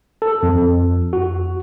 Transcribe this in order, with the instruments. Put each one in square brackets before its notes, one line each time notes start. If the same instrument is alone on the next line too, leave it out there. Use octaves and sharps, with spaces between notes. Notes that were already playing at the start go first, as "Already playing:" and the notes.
[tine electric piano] A4
F2
F#4